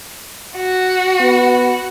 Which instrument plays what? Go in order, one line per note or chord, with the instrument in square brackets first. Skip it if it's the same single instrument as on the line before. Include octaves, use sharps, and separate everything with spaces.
[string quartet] F#4
[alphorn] B3